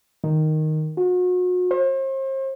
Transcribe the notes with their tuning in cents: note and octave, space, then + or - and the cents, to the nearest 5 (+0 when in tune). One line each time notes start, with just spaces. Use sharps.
D#3 -5
F#4 -40
C5 +40